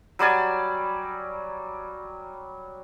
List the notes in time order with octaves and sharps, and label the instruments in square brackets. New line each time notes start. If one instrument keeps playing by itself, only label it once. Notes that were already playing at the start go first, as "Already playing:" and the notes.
[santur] F#3 G3 D5 G#5